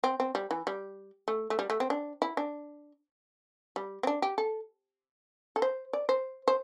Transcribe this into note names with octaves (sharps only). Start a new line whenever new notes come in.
C4
C4
G3
E3
G3
A3
A3
G3
A3
C4
D4
E4
D4
G3
C4
D4
G4
A4
A4
C5
D5
C5
C5